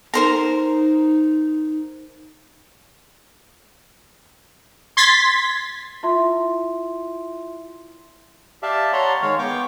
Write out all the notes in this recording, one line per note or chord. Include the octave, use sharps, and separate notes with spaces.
D#4 A#4 C5 A#5
C6 G#6 A6 B6
E4 F4 E5 C6
G4 D5 E5 F5 A5
C#5 F#5 A5 A#5 C6
D#3 G#3 C#5 F5
B3 G5 C#6 D6